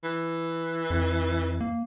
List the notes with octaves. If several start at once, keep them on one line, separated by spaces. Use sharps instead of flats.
E3
F2
A#3